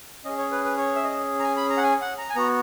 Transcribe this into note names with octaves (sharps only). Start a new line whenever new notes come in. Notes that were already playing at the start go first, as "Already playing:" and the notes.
C#4 G#4 D#5
C#5
B4
B4
C#5
E5
D#5
A#5
G#5
B5
A#5
F#5
G#5
F#5
A#5
G#5
B3 F#4 A#5